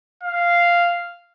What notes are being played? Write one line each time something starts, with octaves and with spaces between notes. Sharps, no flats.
F5